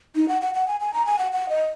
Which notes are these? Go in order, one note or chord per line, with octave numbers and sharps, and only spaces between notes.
D#4
F#5
F#5
F#5
G#5
G#5
A#5
G#5
F#5
F#5
D#5